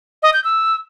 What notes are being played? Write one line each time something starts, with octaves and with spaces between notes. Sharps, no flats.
D#5
G6
E6